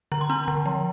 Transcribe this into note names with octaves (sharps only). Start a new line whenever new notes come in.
D3 A#5
C6
C4 A#5
D3
F3